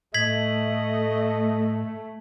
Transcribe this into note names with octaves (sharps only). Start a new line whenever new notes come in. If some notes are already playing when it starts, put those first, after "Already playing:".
A2 A3 D#5 G#6 B6 F#7